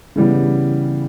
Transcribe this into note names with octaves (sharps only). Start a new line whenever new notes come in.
C#3 E3 G3 B3